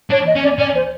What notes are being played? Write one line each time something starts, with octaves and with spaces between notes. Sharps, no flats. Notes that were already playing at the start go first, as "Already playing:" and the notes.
D4 C#5
D#5
C#4
D5
C#4 D5
C5